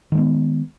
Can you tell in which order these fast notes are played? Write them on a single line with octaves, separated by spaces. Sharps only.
D#3 G#3 B3